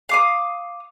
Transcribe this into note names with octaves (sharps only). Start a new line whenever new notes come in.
F5 D6 D#6